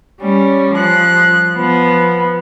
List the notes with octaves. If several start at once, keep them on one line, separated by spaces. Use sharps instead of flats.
G3 C#4
F3 F#6
F3 B3